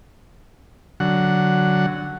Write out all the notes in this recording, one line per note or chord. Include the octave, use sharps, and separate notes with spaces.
D3 F#3 F#5